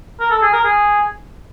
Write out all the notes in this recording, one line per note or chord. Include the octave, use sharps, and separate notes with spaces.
A#4
A4
G#4
A#4
G#4